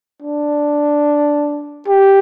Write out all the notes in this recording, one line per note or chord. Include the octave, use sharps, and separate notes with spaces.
D4
G4